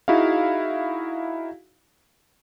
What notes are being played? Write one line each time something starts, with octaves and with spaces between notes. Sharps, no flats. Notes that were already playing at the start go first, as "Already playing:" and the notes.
D#4 E4 F#4 G#4 F5